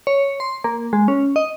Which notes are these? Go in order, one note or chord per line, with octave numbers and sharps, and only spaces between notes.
C#5
C6
A#3
G#3
C#4
D#5